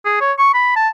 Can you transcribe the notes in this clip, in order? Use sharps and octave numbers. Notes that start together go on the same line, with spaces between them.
G#4
C#5
C#6
B5
A5